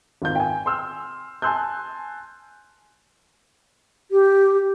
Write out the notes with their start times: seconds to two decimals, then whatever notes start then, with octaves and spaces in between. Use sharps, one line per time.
0.22 G#1 F4 G6
0.35 G5 G#5
0.66 C6 E6 F6
1.42 G#5 A5 C6 E6 F#6 G6
4.11 G4